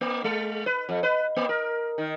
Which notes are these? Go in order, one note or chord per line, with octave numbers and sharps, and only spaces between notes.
A#3
G#3
B4
F2
B4
A#3
A#4
D#3